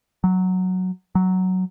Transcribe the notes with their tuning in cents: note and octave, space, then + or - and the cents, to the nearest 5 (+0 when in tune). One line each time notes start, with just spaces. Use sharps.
F#3 +0
F#3 +5